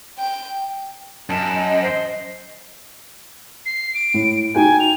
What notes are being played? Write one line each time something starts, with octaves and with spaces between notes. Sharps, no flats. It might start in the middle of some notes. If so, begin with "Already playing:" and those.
G5
F#2 D#5 A5
C5
C7
D7
A2
D#4 F#4 G5 G#5
F7